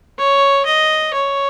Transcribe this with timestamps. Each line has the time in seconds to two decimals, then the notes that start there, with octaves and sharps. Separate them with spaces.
0.18 C#5
0.66 D#5
1.14 C#5